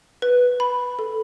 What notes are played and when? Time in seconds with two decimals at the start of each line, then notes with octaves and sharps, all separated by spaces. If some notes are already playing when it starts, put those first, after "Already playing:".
0.22 B4
0.60 B5
0.99 A4